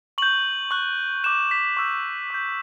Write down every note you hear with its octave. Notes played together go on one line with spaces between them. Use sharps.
C#6 G6 F#7
C#6 F#6
D6 F#6 E7
B6
C#6 E6 G6
D6 G6